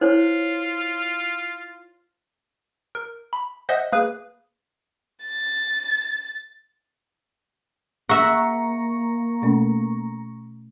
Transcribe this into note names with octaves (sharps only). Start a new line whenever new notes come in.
E4 F4 C5 C#5
A#4
B5
C5 D#5 E5 F#5 D#6 F#6
A#3 G#4 B4
A6
A#3 E5 F#5 A#5 C#6
B2 A3 C#4